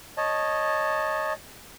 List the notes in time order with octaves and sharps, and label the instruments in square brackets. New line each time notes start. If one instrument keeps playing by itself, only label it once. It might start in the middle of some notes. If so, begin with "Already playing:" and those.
[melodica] C#5 D#5 A5